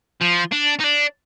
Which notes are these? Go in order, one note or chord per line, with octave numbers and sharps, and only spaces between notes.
F3
D4
D#4
D4